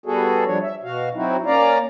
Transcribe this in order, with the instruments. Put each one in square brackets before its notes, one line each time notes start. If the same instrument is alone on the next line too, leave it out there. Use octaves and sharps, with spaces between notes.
[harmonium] G3 B3 F#4 G#4 A4
F3 G3 D4 C#5
E5
B2 F#4 F5
F#3 C4 D#4 E4 F#4
A#3 C#4 D5 F5 A#5